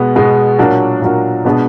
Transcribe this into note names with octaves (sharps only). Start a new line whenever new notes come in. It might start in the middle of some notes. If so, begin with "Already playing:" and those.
Already playing: B2 G#3 B3
B2 G#3 B3
A#2 F#3 D4 F#4 A#4
A#2 F#3 D4 F#4 A#4
B2 G#3 B3 D4 G#4